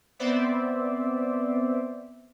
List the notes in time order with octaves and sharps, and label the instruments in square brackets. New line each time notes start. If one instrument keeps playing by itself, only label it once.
[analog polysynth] B3 C4 C5 D5 E5